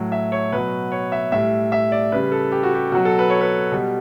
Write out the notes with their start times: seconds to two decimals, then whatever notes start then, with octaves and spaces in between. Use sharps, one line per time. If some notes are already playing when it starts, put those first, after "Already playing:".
Already playing: A2 F#3
0.12 E5
0.32 C#5
0.52 B2 F#3 B4
0.92 C#5
1.12 E5
1.32 A2 G3 E5
1.72 E5
1.92 D5
2.12 C#3 G3 B4
2.32 A4
2.52 G4
2.63 F#4
2.74 G4
2.92 B2 F#3 F#4
3.05 A4
3.19 B4
3.30 C#5
3.41 B4
3.72 B2 G3